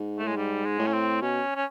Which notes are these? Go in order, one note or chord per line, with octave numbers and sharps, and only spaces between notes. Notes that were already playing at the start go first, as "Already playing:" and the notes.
Already playing: G#2
A3
A2 G#3
G#2 G3
G#3
A2
C#4
C4
B2 C#4
C#4